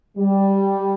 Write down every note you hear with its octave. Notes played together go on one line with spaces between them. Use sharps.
G3